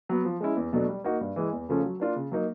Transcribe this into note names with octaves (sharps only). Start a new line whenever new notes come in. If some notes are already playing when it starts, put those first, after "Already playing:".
F#3 B3
F3
G#3 C#4 E4
E2
B2 F#3 A3 D4
G3
A#3 D#4 F#4
G2
E3 G#3
E2
C#3 F3 A3 C#4
F#3
A#3 D4 F4
C#3
F#3 A#3 D#4